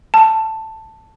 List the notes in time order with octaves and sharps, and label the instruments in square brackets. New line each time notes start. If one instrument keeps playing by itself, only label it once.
[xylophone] A5